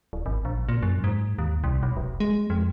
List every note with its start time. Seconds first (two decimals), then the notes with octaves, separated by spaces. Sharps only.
0.13 D1
0.26 G#1
0.45 A#1
0.69 A#2
0.83 F#2
1.04 G#2
1.38 D#2
1.64 C2
1.83 B1
1.97 E1
2.20 G#3
2.50 F2